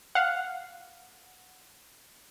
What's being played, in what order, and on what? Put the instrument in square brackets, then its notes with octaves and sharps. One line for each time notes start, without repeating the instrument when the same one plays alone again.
[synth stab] F5 F#5